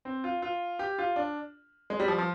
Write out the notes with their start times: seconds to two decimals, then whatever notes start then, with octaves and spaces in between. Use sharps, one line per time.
0.05 C4
0.24 F4
0.42 F4
0.79 G4
0.99 F4
1.16 D4
1.90 G#3
2.00 G3
2.08 F3
2.18 F3